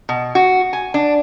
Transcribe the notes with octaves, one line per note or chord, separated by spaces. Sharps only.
B2
F#4
G#5
D4